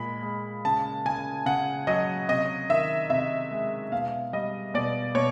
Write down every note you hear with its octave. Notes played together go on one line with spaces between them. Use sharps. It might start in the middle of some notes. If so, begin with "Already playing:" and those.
Already playing: A#2 G#3 B5
G#3
C#3 A5
C#3 G#5
C#3 F#5
F#3 D#5
C3 D#5
D#3 E5
C3 E5
G#3
B2 F5
G3 D#5
B2 D5
B2 C#5